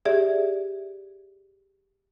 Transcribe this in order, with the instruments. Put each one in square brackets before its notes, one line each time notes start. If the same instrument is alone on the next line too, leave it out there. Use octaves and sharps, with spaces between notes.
[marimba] G4 G#4 D5 E5